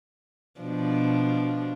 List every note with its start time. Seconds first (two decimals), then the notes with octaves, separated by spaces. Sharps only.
0.61 B2 F3 D4